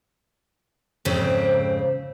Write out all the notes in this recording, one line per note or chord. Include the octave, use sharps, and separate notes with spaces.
F2 G#2 C#3 C4